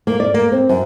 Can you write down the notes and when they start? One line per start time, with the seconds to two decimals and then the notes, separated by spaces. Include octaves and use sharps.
0.07 A#3
0.20 D5
0.34 A#3
0.52 C4
0.69 F#2